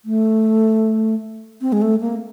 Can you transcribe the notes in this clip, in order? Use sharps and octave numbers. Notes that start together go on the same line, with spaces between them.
A3
C4
G#3
A3
A#3